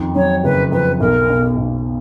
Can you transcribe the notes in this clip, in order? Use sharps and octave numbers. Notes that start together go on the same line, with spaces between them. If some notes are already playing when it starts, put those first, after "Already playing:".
Already playing: F2 D#3
F#3 C#5
F#1 B4
F2 B4
B1 A#4
B2
B1